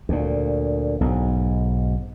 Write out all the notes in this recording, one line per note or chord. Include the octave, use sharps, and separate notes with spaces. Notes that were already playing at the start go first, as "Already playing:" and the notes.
D2 A#2
B1 G#2